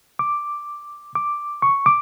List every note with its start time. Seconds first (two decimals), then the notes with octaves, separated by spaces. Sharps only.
0.19 D6
1.15 D6
1.62 C#6
1.86 D6